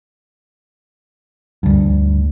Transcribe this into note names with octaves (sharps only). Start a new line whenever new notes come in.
D2 G2